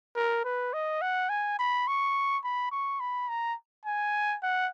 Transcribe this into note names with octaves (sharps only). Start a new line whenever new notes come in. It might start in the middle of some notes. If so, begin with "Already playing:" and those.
A#4
B4
D#5
F#5
G#5
B5
C#6
B5
C#6
B5
A#5
G#5
F#5